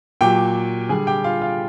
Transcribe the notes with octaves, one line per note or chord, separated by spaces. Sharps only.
A#2 F#3 G4 G5
D3 G3 G#4 G#5
G4 G5
F4 F5
F4 F5